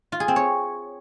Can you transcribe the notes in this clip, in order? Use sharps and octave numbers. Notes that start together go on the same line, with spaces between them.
F4
G#4
C4
C#5